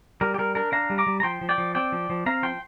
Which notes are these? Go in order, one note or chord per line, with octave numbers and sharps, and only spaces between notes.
G3 A#4
G4
G3 A#4
D4 A#4
D4 F5 A#5
G3
A#5 D6
G3
A#5
F3 G5 C6
F3
D5 G5
F3
C4 D5 G5
F3
F3
C4 F5 A#5
F3 G5 C6